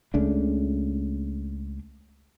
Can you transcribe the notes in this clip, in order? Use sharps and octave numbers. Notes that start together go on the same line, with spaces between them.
C#2 C#3 A3 D4